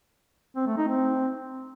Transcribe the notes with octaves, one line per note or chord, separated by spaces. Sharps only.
C4
A3
D#4
C4